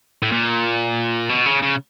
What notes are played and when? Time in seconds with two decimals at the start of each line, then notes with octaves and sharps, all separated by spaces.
0.22 A2
0.32 A#2
1.29 B2
1.46 C#3
1.62 C#3